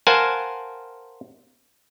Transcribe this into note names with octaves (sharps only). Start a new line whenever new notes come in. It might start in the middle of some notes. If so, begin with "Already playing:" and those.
A#4 C5 F5 F#5 G#5 A5